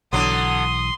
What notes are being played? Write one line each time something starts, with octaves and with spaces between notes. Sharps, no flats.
B1 D3 E3 F#3 B3 C6 D#6